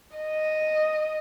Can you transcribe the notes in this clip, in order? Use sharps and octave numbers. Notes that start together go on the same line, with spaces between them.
D#5